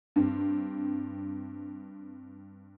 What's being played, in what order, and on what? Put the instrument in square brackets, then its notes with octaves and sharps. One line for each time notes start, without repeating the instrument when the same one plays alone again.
[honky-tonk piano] G2 C4